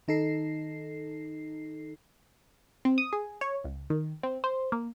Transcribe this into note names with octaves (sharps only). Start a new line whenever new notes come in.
D#3 D#4 A4 C7
C4
D#6
G#4
C#5
C#2
D#3
C4
C5
A#3